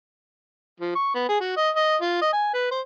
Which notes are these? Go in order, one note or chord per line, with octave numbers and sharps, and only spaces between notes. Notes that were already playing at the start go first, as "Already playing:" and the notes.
F3
C#6
B3
G#4
F#4
D#5
D#5
F4
D#5
G#5
B4
C5